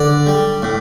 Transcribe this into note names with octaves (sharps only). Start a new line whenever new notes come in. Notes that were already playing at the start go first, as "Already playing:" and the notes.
Already playing: D3 D5
G3
A2